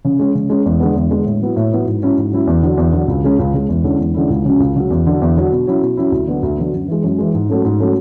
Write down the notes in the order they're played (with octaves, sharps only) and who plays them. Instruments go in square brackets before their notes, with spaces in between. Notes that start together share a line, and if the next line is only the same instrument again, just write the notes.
[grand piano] C#3
G#3 C#4
C#3
G#3 C#4
E2
D3 G#3 B3
E2
D3 G#3 B3
A2
F#3 B3 E4
A2
F#3 B3 E4
G#2
F#3 C#4 E4
G#2
F#3 C#4 E4
E2
D3 F#3
E2
D3 F#3
C#2
C#3 G#3 C#4
C#2
C#3 G#3 C#4
E2
D3 G#3 C#4 E4
E2
D3 G#3 C#4 E4
C#2
C#3 F#3 C#4
C#2
C#3 F#3 C#4
E2
D3 F#3
E2
D3 F#3
B2
F#3 C#4 E4
B2
F#3 C#4 E4
D2
D3 F#3 B3
D2
D3 F#3 B3
F#2
E3 G#3
F#2
E3 G#3
G#2
F#3 A3 C#4
G#2
F#3 A3 C#4